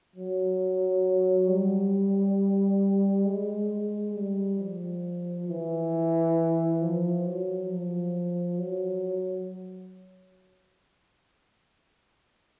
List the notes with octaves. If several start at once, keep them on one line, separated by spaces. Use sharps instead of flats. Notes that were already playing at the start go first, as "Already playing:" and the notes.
F#3
G3
G#3
G3
F3
E3
F3
F#3
F3
F#3